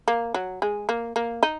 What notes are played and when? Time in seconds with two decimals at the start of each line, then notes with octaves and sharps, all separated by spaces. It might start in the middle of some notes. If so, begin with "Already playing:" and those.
0.08 A#3
0.34 F#3
0.62 G#3
0.89 A#3
1.16 A#3
1.43 D#4